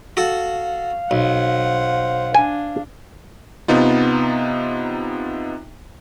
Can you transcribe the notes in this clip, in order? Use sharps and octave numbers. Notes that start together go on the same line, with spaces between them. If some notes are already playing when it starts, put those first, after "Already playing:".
F#4 A4 F5
B1 C5 F#5
D4 G#5
C3 B3 D#4 F4